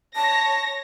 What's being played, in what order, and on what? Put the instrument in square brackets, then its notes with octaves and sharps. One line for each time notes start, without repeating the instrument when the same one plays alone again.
[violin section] C#5 A#6 [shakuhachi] A5